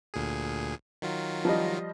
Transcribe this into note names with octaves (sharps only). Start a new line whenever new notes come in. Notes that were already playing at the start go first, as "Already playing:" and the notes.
D2 A#2 G#4
D#3 F#3 F4
F3 G3 D#5